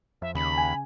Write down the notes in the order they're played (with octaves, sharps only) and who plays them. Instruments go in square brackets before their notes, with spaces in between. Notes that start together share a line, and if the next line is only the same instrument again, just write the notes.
[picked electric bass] F2 [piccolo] E5
[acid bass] D#2 [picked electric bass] C#3 [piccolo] B5
[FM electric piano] G#5